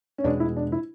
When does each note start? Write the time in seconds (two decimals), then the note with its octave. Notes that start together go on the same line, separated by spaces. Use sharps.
0.18 C#4
0.24 E2 B2 G#3 D4
0.40 E4
0.56 D4
0.72 E4